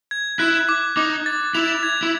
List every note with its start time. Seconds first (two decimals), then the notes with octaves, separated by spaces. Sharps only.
0.11 G#6
0.39 E4 F#6
0.69 D6
0.96 D#4 D6
1.26 A6
1.54 E4 F7
1.83 G#6
2.03 E4